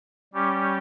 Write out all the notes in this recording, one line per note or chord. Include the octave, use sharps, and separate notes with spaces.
G3 C#4 G4